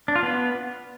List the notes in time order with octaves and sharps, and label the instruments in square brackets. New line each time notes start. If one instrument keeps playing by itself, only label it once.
[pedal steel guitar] D4
F4
B3